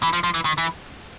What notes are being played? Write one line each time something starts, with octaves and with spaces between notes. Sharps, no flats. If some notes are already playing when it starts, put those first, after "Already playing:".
E3
F3
F3
E3
D#3
E3